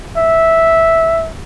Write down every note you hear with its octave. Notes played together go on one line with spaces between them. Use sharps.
E5